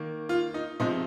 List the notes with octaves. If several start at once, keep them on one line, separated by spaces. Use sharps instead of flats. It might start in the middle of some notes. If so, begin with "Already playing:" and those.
Already playing: D#3 A#3
F4
D#4
C3 F3 G#3 D#4